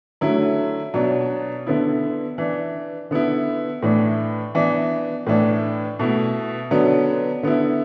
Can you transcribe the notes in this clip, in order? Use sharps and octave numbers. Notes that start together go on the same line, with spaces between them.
D3 F#3 A3 E4
B2 F#3 D4
D3 B3 E4
E3 D4
D3 B3 E4
A2 E3 D4
E3 B3 D4
A2 E3 D4
B2 A3 E4
D3 F#3 B3 D4
D3 B3 E4